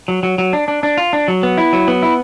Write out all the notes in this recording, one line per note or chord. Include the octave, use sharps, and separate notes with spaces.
F#3
F#3
F#3
D4
D4
D4
F4
D4
F#3
B3
E4
F#3
B3
E4